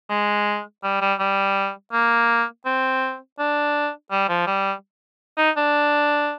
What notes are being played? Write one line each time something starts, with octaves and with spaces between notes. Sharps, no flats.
G#3
G3
G3
G3
A#3
C4
D4
G3
F3
G3
D#4
D4